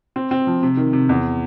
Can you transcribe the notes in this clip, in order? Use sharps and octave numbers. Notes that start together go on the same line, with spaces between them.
C4
C4
F3
C3
D#3
C3
E2